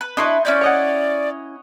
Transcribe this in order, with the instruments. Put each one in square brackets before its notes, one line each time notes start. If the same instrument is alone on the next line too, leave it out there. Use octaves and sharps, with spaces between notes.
[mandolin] B4
[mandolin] D4 E4 B4 [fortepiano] D#5 C6 C#6
[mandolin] C#4 E4 G6 [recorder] D5
[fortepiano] C#5 D#5 F#5